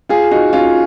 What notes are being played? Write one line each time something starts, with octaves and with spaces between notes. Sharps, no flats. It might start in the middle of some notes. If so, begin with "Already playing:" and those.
F4 G#4
D#4 F#4
C#4 F4